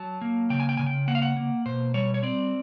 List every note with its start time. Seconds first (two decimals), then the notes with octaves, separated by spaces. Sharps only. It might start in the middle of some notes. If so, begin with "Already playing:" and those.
Already playing: F#3 A5
0.21 A#3
0.50 C#3 G5
0.60 G#5
0.69 G5
0.77 C#3 G#5
0.87 G5
1.08 A#3 F#5
1.15 F5
1.22 F#5
1.37 A#3
1.66 B2 C5
1.94 G3 C#5
2.14 C#5
2.23 C4 D5